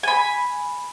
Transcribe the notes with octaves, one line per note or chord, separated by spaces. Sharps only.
G#5 B5